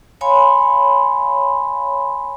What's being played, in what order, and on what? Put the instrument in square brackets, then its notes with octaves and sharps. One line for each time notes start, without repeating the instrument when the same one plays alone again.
[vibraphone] C#5 F5 G#5 B5 C6